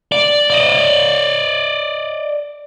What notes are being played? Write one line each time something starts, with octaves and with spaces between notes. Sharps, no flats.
D5
D5 D#5